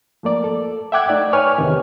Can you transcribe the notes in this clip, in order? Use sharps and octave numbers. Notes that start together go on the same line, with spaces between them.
F3 A3 A#3 D5
A4
E5 F#5 G5 D6 F#6 G#6
A3 D#4 D5
B4 C#5 G#5 C#6 F6
E2 C3 D#3